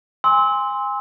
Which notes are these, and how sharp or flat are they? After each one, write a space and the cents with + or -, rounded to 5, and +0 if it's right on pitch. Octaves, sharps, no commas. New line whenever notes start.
G#5 -25 C6 +0 E6 -30